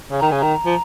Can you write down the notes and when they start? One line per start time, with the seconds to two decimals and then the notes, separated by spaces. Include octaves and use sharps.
0.11 C#3
0.20 D#3 A#5
0.30 C#3 G#5
0.40 D#3 A#5
0.66 F3